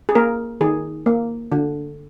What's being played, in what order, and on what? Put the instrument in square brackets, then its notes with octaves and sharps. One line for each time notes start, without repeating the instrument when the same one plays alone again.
[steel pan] G#4
A#3 A#4
D#3 G#4
A#3
D3